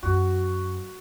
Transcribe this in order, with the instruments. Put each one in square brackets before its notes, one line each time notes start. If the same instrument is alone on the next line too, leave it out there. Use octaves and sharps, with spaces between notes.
[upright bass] F#2 [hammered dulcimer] F#4